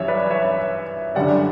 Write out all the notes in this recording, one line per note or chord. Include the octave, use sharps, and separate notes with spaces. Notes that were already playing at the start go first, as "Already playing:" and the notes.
Already playing: F#2 E3 G3 C#5 E5
B4 D5
C#5 E5
F#2 D3 G3 D5 F#5